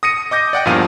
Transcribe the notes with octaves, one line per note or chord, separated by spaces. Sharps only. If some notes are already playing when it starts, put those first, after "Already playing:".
D#6 A#6 C#7 D#7
D#5 D6 G6 A#6
D5 F#5 G5
E2 G2 A#2 F3 F5 D#7